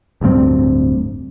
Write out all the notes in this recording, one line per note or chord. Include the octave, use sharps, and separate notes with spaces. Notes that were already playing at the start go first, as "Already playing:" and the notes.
D1 D2 G2 C4